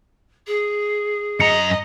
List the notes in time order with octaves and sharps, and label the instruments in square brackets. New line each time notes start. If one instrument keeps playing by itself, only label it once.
[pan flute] G#4
[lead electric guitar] F#2 A#5 [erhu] D#5 [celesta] C#7